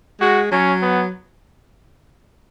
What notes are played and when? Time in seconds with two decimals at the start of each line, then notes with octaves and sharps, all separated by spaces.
0.21 G#3 F#4
0.52 F#3 C#4
0.82 B3